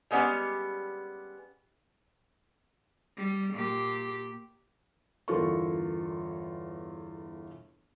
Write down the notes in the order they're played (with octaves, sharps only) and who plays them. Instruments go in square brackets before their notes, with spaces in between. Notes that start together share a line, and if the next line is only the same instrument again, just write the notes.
[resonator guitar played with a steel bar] G3 G#3 B3 C#4 G4
[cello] G3
A#2 G4
[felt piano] G1 E2 F4 A4 A#4 C#6